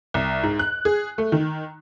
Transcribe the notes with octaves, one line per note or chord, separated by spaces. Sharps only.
C2
G#2
F#6
G#4
A3
D#3